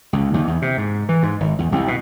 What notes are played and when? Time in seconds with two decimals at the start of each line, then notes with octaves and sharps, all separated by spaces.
0.13 C#2
0.34 D#2
0.47 E2
0.62 C3
0.78 G#2
1.09 E3
1.23 G#2
1.40 G#1
1.58 E2
1.72 C2
1.88 B2